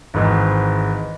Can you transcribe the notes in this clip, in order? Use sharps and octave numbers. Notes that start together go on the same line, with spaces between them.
G#1 G#2 E3